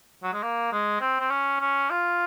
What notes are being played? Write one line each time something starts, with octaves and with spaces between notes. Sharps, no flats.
F#3
G#3
A#3
G#3
C4
C4
C#4
C#4
F4